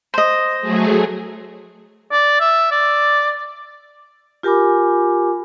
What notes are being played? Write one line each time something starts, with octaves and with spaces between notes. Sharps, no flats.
C5 D#5
F#3 A3 G#4
D5
E5
D5
F4 G4 A#4 G#5 B5 D6